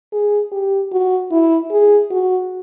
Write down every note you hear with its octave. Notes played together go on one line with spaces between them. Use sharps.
G#4
G4
F#4
E4
G#4
F#4